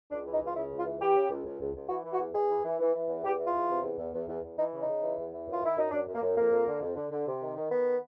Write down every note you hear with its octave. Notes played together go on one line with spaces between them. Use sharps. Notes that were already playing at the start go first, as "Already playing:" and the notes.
C#2 D4
E3
D#4
C#2
F4
C#3 E4
C#2
F4
E3
E3 G4
C#3
C#2
C#2
C#2
C#2
E3 F#4
E3
F#4
E2
E2 G#4
E3
E3
E3
E3
E2
E2 G4
E3
F4
E2
C3
E2
E2
E2
E2
E2
E3 D#4
C#3
D#4
C#3
E3
E2
E3
F#2
F4
D#3 E4
F#2 D#4
F#2 D4
F#2
A#3
F#2
F2 A#3
F2
D3
F2
D3
D3
C3
D#3
D#3
D#3 B3